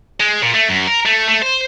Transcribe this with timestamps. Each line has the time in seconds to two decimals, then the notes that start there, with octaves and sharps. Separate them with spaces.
0.20 G#3
0.42 A#2
0.54 A3
0.69 F#2
0.87 A#4
1.06 A3
1.29 A3
1.43 C5